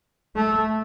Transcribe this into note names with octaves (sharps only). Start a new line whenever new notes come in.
A3